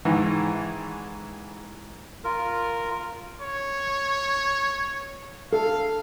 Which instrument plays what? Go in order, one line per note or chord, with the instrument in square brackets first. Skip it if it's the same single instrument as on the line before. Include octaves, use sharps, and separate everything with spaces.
[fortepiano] G#2 D#3 E3
[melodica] F4 A#4
[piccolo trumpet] C#5
[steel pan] A4 [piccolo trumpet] F5